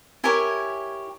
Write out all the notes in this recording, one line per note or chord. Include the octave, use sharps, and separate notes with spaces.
E4 G4 A#4 C#5 G#5